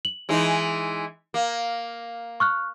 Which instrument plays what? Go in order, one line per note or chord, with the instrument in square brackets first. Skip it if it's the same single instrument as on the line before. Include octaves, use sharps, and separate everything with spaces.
[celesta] F#7
[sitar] E3 G#3 D#4
A#3
[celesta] C#6 F6 F#6